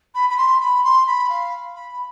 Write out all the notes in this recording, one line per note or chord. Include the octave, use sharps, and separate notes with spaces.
B5
B5
C6
B5
C6
B5
F5
B5